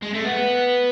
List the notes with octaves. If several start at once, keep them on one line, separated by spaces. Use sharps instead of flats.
G#3
A3
B3